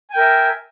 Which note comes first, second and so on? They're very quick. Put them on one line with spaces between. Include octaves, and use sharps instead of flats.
G#5 G5 A#4 E5